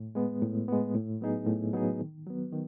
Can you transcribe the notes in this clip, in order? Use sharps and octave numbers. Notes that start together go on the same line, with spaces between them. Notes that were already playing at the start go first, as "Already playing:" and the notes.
Already playing: A2
G#3 B3
A2
G#3 B3
A2
F#3 B3 D#4 G#4
A2
F#3 B3 D#4 G#4
D#3
F#3 B3
D#3